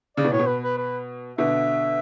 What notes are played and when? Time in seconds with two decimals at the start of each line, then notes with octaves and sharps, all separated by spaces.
0.17 C#3 D5
0.25 B2
0.32 A2 C#5
0.39 B2
0.47 B4
0.63 B4
0.78 B4
1.38 B2 D3 E5